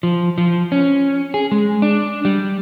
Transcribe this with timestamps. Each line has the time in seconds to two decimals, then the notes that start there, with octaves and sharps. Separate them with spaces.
0.03 F3
0.38 F3
0.72 C#4
1.34 G#4
1.52 G#3
1.82 D4
2.25 G3